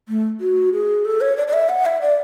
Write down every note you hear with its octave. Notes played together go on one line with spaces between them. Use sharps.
A3
F#4
G#4
A4
C#5
D5
D5
E5
F#5
E5
D5